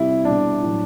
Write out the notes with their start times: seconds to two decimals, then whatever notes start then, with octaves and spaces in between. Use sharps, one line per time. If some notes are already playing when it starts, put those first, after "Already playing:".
Already playing: C3 G3 E4
0.25 B2 G3 D4
0.62 A2 F#3